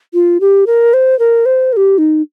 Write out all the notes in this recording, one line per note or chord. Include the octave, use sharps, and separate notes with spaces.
F4
G4
A#4
C5
A#4
C5
A#4
G4
D#4